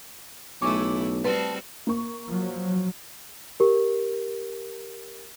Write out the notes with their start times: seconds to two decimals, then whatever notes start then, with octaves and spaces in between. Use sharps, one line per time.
0.62 B1 C#3 A3 E4 G#5 C#6 D6
1.24 G3 C4 F#4 B4 A5 C6
1.87 A#3 C#6
2.27 F3 F#3
3.60 G4 A#4